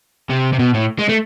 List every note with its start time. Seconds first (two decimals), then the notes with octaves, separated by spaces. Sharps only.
0.29 C3
0.53 C3
0.59 B2
0.74 A2
0.99 G#3
1.09 A3